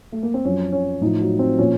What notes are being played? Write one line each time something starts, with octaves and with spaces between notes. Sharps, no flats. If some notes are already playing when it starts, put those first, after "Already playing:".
A3
A#3
C4
F#2 F3 C#4
C#4
A2 F3 D#4
F#3
C4
A#2 F3 C#4